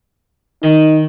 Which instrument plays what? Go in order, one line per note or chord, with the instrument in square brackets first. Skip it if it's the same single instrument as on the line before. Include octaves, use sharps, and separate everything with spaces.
[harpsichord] D#3 [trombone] D#4